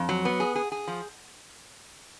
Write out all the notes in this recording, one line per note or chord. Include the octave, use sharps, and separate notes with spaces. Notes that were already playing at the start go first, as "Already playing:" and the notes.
Already playing: F2
F#3
B3
G#4
G#4
G#4
F3